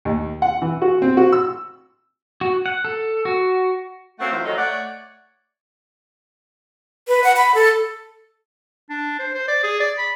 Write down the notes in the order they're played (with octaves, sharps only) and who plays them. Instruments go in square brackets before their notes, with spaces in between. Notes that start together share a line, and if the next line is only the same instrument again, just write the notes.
[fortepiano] D#2
F#5
E3
F#4
C4
F#4
E6
[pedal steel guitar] F#4
F#5
A4
F#4
[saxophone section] A3 A#3 C4 C#4 F#4
E3 F#3 E4 F4 C5 E5
D#3 F3 F#3 A3 D#4
A3 C#5 D5 F#5
[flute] B4
F#5
B5
A4
[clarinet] D4
C5
C5
D5
G#4
D5
B5